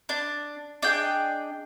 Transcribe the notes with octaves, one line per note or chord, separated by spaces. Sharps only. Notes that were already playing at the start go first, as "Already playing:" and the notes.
D4
D4 G#4 D#5 G5